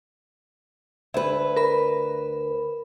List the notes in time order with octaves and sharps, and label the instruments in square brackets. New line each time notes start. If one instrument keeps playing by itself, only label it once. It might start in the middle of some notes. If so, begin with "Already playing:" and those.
[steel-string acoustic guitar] D2 B4 [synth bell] E5
[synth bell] A#4 B5